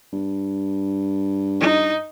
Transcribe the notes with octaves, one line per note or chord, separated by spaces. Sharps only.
G2
D#4